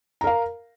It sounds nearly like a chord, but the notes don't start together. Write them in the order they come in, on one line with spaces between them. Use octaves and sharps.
A#5 A#4 F5